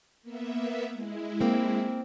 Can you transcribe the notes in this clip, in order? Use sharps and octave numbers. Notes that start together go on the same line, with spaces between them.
A#3 B3 E5
G#3 E4
A#3 C4